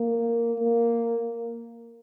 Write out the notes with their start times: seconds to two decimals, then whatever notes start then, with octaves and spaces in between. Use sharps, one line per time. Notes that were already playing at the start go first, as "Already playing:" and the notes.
Already playing: A#3
0.60 A#3